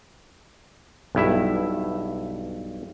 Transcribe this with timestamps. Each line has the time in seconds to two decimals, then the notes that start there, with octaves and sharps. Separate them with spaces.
1.15 B1 G2 E4 E5